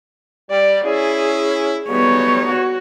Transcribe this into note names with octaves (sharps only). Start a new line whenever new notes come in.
G3 D5
C#4 E4 G#4
F#3 G3 A3 B3 D#4 C#5
F#4